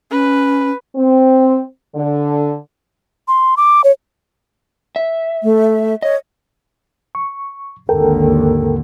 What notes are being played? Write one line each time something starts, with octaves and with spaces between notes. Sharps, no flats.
C#4 B4
C4
D3
C6
D6
C#5
E5
A3
C#5 D#5
C#6
G#1 D#2 D3 A4 A#4 G5